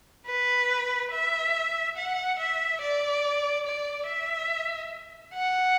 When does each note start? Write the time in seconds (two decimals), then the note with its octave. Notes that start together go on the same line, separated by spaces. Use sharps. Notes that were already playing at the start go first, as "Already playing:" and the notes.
0.27 B4
1.12 E5
1.97 F#5
2.39 E5
2.81 D5
3.66 D5
4.08 E5
5.35 F#5